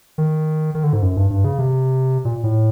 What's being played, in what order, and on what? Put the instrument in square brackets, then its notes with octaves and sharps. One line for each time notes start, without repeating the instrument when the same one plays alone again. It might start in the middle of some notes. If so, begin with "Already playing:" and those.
[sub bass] D#3
D#3
D3
G#2
F#2
G2
G2
C#3
C3
A#2
A2